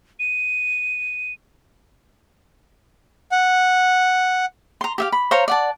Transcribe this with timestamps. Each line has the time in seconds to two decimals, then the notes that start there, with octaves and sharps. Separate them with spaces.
0.19 D#7
3.32 F#5
4.81 A#5 C6
4.98 G4 E5 F5
5.12 B5
5.31 C5 C#5 F5 A#5
5.48 D5 F#5 A5